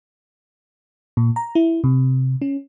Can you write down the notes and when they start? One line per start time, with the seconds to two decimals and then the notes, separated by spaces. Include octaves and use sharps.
1.17 A#2
1.36 A#5
1.55 E4
1.84 C3
2.42 C#4